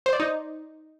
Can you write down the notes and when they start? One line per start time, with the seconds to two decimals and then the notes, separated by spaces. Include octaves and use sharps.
0.06 C5
0.13 D5
0.20 D#4